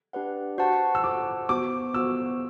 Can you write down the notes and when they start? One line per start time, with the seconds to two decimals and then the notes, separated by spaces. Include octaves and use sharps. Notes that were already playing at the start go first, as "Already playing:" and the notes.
0.13 D4 G4 B4 D5 F#5
0.58 F#4 C5 F#5 A5
0.95 E6
1.04 F#4 C5 F#5 A5 D6
1.49 B3 F#4 C5 D6
1.94 B3 F#4 C5 E6